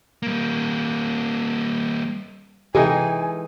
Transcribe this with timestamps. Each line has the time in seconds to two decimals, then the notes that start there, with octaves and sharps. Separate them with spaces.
0.23 G3 A#3
2.75 C3 E3 G#3 D#4 A4 E5 G5 G#5